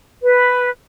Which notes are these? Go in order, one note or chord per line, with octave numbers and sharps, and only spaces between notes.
B4